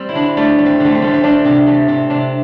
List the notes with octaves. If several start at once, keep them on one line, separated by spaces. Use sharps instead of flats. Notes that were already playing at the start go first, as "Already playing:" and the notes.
Already playing: G3 C4
E4
D3 D4
G3 A3
G3
C4
D3 A3
C4
G3 A3
C4
G3 D4
C3 C4
G3 A3
C3 C4
C3 D4